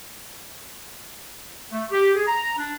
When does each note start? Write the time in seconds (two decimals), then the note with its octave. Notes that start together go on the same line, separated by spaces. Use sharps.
1.70 A3
1.91 G4
2.14 G#4
2.27 A#5
2.57 D4